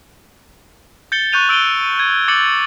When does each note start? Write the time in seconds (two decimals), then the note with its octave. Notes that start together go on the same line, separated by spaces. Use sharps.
1.12 G6 A6 C#7 G7
1.32 C#6 F#6 G6 D#7 F7
1.49 E6 D7 D#7 G7
1.99 G#6
2.28 D6 A6 C#7 F#7